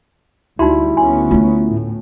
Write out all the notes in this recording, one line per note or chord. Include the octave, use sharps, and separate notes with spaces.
D2 G3 D#4 E4 F#4 C6
D2 B3 C#4 G#5 C6
A3 D#4 F4
A2